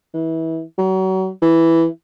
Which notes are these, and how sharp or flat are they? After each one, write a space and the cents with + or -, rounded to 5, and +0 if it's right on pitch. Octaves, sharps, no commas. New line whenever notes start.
E3 -25
F#3 +35
E3 +0